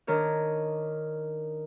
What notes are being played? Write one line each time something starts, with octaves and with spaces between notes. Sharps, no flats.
D#3 D4 A#4 C#5